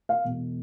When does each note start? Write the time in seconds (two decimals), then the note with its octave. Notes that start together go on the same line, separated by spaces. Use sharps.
0.09 F5
0.24 E1